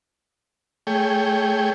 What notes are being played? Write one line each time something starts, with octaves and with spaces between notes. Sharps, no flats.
A3 G#4 C#5 G5